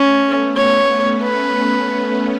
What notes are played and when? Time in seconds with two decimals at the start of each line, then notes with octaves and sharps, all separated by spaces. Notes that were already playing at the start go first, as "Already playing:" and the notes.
Already playing: A3 C#4
0.24 B3
0.56 C#4 C#5
0.90 B3
1.23 B4